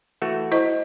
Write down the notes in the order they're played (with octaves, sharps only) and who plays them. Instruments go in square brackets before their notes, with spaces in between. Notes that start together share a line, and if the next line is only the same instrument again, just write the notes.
[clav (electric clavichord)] E3 A3 F#4
[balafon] E4 C5 D#5